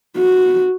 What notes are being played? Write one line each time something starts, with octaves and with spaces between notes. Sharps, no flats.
F#4